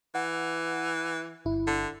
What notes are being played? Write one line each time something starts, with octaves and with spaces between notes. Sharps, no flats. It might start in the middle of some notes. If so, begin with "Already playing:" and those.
E3 F#5
G1 E4
D3